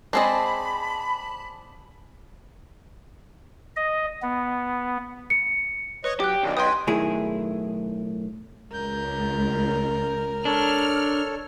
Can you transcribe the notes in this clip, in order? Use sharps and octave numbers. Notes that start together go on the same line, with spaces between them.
G#3 C4 G#4 C5 D5 D#5 A5 B5
D#5
B3
C#7
B4 C#5 D#5 C#6
F#3 G4 D6 F#6
B1 D#3 D4
B4 G5 G#5 C6 D#6
B1 A2 D#3 E4 G#4
C#2 A#4 G6
D4 A4 C#5 F6